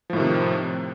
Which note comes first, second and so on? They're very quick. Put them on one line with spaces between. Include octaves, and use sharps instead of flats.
F3 A2 D#3 C3